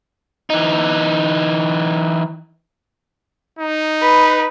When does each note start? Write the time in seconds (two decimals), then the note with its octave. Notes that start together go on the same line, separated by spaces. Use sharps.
0.50 E3 D#4
3.59 D#4
4.01 B4